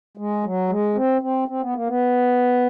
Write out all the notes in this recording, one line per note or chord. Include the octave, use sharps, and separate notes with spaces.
G#3
F#3
G#3
C4
C4
C4
B3
A#3
B3